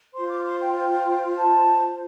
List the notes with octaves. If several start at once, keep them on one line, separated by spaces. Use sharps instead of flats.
F4 C5 C6
D6
C6
G5
G5
A5